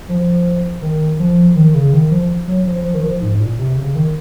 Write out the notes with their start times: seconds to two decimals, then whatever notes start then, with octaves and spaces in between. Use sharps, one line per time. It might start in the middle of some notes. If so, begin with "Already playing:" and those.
0.09 F3
0.82 D#3
1.19 F3
1.56 D#3
1.74 C#3
1.92 D#3
2.11 F3
2.48 F#3
2.66 F3
2.84 F3
2.94 D#3
3.03 F3
3.21 G#2
3.32 G#2
3.40 A#2
3.58 C3
3.77 C#3
3.95 D#3